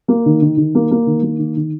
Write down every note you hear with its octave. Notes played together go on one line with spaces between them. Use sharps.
A#3
D#3
D#3
D#3
A#3
A#3
D#3
A#3
D#3
D#3